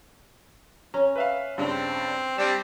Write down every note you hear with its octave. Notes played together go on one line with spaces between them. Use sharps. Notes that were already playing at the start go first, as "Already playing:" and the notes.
C#4 A#5
B4 E5 F5
G2 C#3 C4 D4
G3 C4 D4 E7